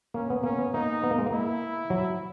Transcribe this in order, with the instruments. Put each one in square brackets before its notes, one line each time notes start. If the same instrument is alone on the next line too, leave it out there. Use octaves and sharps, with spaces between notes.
[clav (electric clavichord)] A#3 [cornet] C#4
[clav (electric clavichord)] B3
[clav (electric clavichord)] A#3 [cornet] C#4
[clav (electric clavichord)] B3
[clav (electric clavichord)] A#3 [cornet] D#4
[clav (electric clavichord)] B3
A#3
G#3
A#3
[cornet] E4
[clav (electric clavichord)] F#3